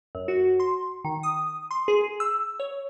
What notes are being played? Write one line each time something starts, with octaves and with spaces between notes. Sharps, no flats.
F#2
F#4
C6
D#3
D#6
C6
G#4
E6
C#5